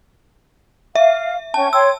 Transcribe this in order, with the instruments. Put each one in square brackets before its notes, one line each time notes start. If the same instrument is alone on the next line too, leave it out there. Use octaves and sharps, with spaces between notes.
[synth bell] E5 [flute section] F5
[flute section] C#4 G5 [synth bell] A5
[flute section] C#5 G5 C6 [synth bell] E6